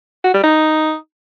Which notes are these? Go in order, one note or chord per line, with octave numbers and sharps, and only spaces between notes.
F#4
G3
D#4